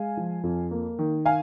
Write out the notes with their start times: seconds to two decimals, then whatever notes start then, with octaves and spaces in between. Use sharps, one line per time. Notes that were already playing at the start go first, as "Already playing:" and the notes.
Already playing: G#3 F5 G#5
0.17 F3
0.43 F2
0.71 A#3
0.99 D#3
1.26 F5 G#5